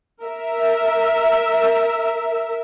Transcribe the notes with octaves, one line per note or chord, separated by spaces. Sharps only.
A#4 E5